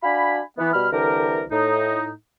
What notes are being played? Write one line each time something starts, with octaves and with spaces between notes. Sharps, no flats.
D4 F#4 F5 G#5 B5
E3 B3
B2 G3 B5 F6
C2 D3 E3 G4 A#4
A2 D#4